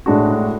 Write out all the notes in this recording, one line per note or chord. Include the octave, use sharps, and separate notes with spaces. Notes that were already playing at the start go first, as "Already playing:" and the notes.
A2 G#3 D4 F#4